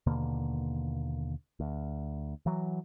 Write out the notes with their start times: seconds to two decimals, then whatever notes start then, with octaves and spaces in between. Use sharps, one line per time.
0.06 D#2 B2 D3 A#3
1.60 D2
2.46 E3 F#3